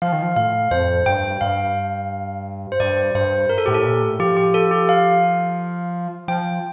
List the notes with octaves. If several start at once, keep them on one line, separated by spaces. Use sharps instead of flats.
F3 F5
D#3
F3
A2 F5
F2 C5
G2 G5
G2 F5
C5
G2 D5
G2 C5
A#4
A4
A2 G4
A4
A#2
A2
F3 G4
G4
A4
G4
F5
F3 G5